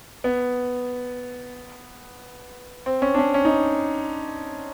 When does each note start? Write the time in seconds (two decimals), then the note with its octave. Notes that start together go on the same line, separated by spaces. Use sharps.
0.24 B3
2.86 C4
3.02 C#4
3.14 D4
3.18 C#4
3.34 C#4
3.45 D#4